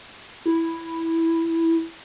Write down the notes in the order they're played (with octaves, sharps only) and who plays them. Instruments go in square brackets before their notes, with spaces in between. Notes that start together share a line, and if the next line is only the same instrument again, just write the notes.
[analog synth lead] E4